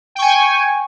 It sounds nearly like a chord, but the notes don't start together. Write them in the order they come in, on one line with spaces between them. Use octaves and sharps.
G5 C#6 G#5